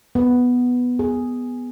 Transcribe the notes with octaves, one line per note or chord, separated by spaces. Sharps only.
B3
G#4